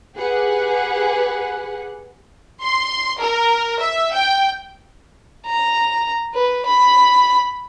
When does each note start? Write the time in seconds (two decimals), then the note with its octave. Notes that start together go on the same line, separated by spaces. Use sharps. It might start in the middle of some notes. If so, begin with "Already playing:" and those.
0.16 G4 G#4 B4 F#5
2.61 C6
3.20 A#4
3.79 E5
4.13 G5
5.46 A#5
6.34 B4
6.66 B5